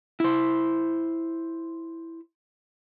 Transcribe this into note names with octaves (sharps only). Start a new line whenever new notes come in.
E4 C5